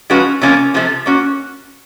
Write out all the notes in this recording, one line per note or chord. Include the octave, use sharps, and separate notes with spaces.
F3 G#3 C#4 F#4 B4
C3 F3 A#3 C#4
C3 F3 A3
A#3 C#4 F#4